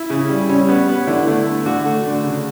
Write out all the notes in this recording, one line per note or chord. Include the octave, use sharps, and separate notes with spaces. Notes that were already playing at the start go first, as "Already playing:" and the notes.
Already playing: E4
C#3
G3
G3 C#4
B3
B3
D3 E4
A3
A3
D3 F#4
A3
D3
C#3